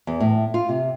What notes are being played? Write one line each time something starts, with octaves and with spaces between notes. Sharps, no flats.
E2
A2
F4
C3